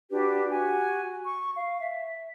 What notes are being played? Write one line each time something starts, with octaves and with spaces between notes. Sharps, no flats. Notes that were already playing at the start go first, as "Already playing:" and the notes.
D4 F#4 G4 B4
F#4 G4 G#5
C#6
F5
E5